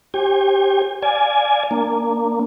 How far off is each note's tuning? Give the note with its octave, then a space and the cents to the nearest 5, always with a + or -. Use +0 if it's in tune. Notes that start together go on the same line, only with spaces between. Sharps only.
G4 +0 C5 +45 G#5 -35
D5 +0 F5 +0 G#5 +10
A#3 -10 D4 +0